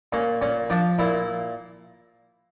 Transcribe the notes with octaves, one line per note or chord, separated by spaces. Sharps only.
A#2 C#4
A#2 C#4
F3 D4
A#2 E4